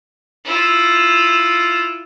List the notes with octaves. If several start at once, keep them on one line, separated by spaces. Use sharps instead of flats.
E4 F4